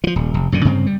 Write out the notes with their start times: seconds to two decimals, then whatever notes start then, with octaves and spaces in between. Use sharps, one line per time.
0.04 E3 F3
0.16 D#1
0.34 F1
0.52 F#2 A#2 D3
0.65 G2 C#3 C4
0.86 G3